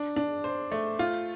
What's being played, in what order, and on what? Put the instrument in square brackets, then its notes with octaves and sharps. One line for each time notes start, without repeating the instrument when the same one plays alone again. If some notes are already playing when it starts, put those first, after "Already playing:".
Already playing: [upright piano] D4
D4
C5
A3
F4